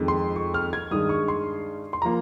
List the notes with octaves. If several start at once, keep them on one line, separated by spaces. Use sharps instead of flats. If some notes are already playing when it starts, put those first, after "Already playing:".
Already playing: F2 D#3 G#3
C6
C#6
F6
G#6
G2 D#3 G#3 D#6
C#6
C6
C6
F3 A#3 A#5